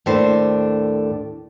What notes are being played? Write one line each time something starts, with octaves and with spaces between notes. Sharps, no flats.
D#2 A2 D4 A4 B4 C5